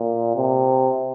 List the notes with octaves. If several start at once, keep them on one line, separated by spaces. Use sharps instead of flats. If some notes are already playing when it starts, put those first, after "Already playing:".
Already playing: A#2
C3